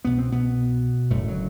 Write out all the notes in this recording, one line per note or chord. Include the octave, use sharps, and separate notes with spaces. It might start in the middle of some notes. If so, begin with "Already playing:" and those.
C2 B2 B3
C4
B2 B3
F#1 F#2 A2 D3 A3
F#3